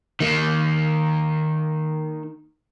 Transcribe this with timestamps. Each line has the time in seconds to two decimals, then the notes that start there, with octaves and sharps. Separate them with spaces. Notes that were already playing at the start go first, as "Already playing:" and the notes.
0.20 D#3 A#3